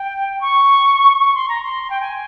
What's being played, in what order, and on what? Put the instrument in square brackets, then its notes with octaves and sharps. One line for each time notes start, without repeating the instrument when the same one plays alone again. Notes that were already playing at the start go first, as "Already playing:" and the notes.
Already playing: [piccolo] G5
C#6
C#6
C6
A#5
C6
G5
G#5